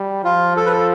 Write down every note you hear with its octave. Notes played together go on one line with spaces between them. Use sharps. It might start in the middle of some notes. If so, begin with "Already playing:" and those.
Already playing: G3
F3 F4
A4
B4
A4